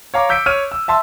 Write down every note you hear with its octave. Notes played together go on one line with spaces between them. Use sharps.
C#5 F5 A#5 D6
E6 G6 B6 C#7 D7
C#5 F6 D7 D#7
E6
E5 A5 C6 E6